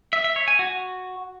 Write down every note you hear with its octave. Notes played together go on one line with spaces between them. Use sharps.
E5
E5
C#5
G#5
F#4